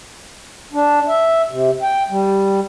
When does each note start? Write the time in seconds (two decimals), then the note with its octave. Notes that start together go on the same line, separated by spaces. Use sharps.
0.73 D4
1.08 E5
1.50 C3
1.83 G5
2.10 G3